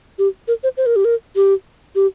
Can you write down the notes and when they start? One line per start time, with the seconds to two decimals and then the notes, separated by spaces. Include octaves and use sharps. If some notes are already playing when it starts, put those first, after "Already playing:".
0.19 G4
0.48 A#4
0.63 C5
0.77 C5
0.86 A#4
0.96 G4
1.05 A#4
1.36 G4
1.95 G4